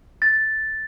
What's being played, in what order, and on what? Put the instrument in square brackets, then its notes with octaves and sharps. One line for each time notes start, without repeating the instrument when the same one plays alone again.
[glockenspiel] A6